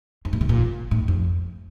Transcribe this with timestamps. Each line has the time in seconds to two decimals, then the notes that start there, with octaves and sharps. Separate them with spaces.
0.25 F2
0.33 A#2
0.41 C3
0.49 A#2
0.91 A2
1.08 F2